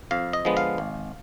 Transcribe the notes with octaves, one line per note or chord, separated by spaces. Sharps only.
F2 F5
D#5
D3 F3 G#3 B3
F5
G#1